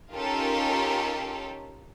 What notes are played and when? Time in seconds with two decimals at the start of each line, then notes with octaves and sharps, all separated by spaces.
0.14 C#4 D#4 F4 G4 A4 A#4